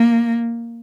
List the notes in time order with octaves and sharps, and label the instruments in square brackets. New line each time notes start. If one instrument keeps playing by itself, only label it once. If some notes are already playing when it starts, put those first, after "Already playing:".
Already playing: [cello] A#3